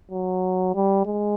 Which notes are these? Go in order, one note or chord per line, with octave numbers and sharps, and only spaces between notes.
F#3
G3
G#3